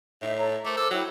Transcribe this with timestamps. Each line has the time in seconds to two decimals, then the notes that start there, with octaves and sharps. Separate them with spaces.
0.22 A2 D#4 E5
0.38 A4 C#5 A#5
0.65 A3 A#4 C5 D6
0.77 A4
0.91 F#3 E4 G5